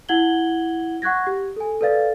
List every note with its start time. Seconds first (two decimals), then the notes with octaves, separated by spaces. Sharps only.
0.09 E4 F#5 G#6 F#7 G7
1.02 F#5 C#6 F#6 G#6 A#6
1.27 G4
1.56 A4 G#5
1.81 A4 B4 D5 F5 A6